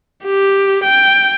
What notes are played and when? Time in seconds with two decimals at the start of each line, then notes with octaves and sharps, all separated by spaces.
0.24 G4
0.83 G5